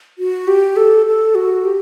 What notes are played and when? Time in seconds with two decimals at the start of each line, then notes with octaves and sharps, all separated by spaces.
0.19 F#4
0.48 G4
0.76 A4
1.06 A4
1.35 F#4
1.65 G4